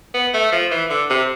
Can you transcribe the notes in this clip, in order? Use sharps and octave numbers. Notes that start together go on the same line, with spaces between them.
B3
A3
F3
E3
D3
C3